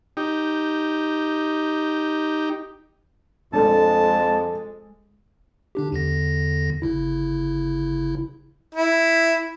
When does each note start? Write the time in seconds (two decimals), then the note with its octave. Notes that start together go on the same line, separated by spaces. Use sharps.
0.17 D#4 G4
3.53 F2 G#3 D4 A4 A5
5.75 D3 D4 G4
5.92 E2 D3 A#6
6.82 G1 C#3 E4
8.75 E4